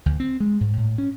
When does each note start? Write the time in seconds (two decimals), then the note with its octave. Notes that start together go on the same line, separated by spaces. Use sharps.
0.06 D2
0.20 C4
0.40 G#3
0.61 G#2
0.77 A2
0.98 C#4